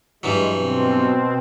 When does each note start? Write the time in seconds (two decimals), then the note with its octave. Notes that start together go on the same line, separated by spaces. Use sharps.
0.23 G2 E3 F#3 G#3
0.55 B2 C4